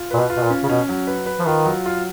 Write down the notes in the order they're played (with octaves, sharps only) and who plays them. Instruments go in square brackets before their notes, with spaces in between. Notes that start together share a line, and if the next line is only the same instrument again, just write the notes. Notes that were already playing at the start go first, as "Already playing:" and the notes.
Already playing: [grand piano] F4
[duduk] A#2 [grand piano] B4
[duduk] B2
[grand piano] F4
[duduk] B2
A#2
[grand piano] C#4
[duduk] C#3
[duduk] B2 [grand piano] C#4
[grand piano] F#3
B4
B4
[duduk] F3
[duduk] D#3 [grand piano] F4
[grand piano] F#3
F4